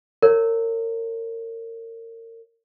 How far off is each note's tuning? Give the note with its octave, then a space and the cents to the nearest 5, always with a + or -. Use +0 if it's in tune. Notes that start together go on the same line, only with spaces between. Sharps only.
A#4 -35 C#5 +0